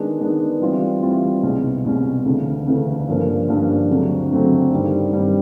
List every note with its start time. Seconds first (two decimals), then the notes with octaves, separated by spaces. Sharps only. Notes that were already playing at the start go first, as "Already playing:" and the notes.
Already playing: D#3 G#3 B3 D4
0.20 D#3 G#3 B3 D4
0.61 E3 G3 C4 F4
1.02 E3 G3 C4 F4
1.43 C2 B2 G#3 C#4
1.84 C2 B2 G#3 C#4
2.25 D2 C#3 E3 A3
2.67 D2 C#3 E3 A3
3.07 G2 D3 F3 A#3 C#4
3.48 G2 D3 F3 A#3 C#4
3.90 D2 C#3 F#3 A3 C4
4.31 D2 C#3 F#3 A3 C4
4.71 G2 D#3 G3 C4
5.12 G2 D#3 G3 C4